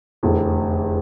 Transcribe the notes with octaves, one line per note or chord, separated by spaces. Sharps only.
F1 E2 D3